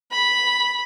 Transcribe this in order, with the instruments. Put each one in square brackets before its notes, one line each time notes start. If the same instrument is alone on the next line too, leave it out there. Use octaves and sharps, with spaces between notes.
[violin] B5